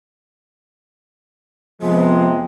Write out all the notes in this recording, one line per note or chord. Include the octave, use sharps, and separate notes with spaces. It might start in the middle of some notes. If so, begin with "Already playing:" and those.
F2 C3 F3 G#3 B3